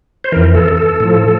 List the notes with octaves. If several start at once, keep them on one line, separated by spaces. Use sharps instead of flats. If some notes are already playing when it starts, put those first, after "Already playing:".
C5
F2 E3 A#4
A4
A4
A2 F3